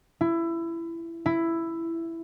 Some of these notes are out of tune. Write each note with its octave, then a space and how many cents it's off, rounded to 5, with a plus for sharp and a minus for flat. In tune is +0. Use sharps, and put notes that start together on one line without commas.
E4 +20
E4 +10